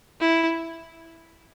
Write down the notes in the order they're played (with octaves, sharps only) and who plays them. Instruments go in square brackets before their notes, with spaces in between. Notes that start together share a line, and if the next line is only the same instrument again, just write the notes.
[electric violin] E4